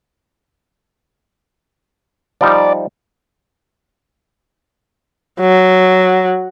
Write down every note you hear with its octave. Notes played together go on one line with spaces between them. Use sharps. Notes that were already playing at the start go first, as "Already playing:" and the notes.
F3 G3 D#4 D5
F#3